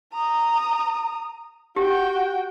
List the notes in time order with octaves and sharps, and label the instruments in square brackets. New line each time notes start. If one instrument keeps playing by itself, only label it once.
[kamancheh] A#5 D#6
[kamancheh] F#4 G5 [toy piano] G4